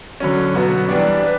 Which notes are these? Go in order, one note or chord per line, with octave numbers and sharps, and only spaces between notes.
D3 F#3 C#4
B2 F#3 B3 F#4
E3 G3 B3 D4
B4